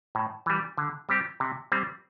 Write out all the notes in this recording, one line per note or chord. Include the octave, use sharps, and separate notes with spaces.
A2
E3 G3
D3
G3 C4 G4
C3
G3 C4